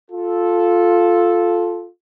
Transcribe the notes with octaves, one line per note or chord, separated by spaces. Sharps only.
F4 A4